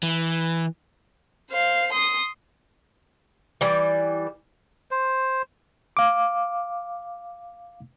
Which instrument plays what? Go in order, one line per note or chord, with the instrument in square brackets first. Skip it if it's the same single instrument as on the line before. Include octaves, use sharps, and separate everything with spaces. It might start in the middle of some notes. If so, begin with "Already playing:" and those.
[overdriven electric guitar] E3
[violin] C5 F5
C6 D#6
[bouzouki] E3 G3
[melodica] C5
[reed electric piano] F5 D6